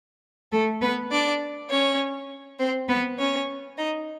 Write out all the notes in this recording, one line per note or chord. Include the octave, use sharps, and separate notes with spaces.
A3 A4
B3 B4
D4 D5
C#4 C#5
C4 C5
B3 B4
C#4 C#5
D#4 D#5